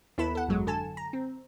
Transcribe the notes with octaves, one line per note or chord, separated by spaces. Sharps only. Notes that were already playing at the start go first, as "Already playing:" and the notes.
D#2 B3 E4 A4 B5 E7
A4 F#5
G#1 F#2 F#3 G#3
D3 A4 G#5 A5 E7
A#5
C4